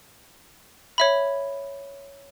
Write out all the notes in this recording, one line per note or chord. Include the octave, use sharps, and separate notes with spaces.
C#5 E5 B5